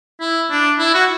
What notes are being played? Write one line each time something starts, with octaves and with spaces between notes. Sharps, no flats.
E4
D4
E4
F#4